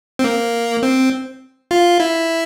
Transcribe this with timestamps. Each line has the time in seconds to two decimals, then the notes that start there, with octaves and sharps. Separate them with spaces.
0.19 C4
0.24 A#3
0.83 C4
1.71 F4
2.00 E4